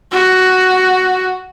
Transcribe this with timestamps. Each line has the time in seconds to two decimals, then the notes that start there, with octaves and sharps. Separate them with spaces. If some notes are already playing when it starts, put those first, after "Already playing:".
0.12 F#4